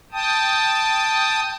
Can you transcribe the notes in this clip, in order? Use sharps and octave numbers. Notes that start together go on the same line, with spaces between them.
G5 A5 D#6